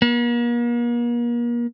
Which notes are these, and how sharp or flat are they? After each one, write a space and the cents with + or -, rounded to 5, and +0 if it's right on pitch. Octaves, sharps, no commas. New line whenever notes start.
A#3 +40